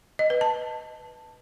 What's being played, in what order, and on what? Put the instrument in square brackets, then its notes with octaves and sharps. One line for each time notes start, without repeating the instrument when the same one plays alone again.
[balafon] D#5
B4
A5